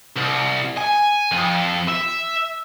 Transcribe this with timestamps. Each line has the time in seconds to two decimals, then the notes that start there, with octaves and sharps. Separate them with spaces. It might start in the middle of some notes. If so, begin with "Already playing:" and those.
0.16 C2
0.77 G#5
1.32 F2
1.88 E5